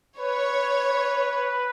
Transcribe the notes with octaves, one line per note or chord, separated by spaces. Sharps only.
B4 C#5